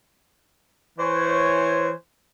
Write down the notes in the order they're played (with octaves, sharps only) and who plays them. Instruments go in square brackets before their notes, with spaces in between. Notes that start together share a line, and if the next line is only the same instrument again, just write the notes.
[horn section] E3 C5 C#5